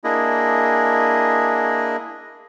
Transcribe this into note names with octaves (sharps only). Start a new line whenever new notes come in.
A#3 D4 E4 G#4 D#5